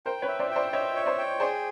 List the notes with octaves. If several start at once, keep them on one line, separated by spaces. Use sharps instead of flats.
A#4 C5 G5
B4 C#5
E5
C5 D5
G5
C5 D5
C#5 D#5 E5
C#5
C5 D5
G5
G#4 C5 D5